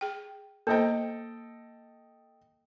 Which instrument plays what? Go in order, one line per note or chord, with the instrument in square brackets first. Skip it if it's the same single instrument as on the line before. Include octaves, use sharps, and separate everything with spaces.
[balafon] G#4 G5
[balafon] A#3 C5 [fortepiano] A4 D#5 G5